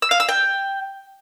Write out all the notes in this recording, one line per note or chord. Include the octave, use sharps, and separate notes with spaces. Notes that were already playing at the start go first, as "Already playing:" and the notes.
E6
F5
E6
G5